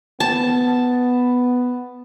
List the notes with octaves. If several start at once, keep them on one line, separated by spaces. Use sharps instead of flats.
B3 A5